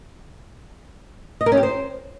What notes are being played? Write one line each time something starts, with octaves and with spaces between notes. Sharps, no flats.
D#5
A#4
C#4
G4
C5